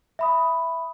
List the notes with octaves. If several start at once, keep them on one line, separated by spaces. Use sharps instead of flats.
E5 B5 D#6